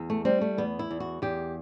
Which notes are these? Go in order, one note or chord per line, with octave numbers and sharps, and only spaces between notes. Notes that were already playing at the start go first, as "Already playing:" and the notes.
Already playing: E2
A3
G3 C4
A3
E2 B3
E4
E2
F#4
E2 G4